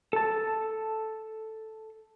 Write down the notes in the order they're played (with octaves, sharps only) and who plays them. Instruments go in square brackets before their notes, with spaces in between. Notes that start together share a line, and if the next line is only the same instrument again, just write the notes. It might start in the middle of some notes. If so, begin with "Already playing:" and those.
[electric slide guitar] A4 A5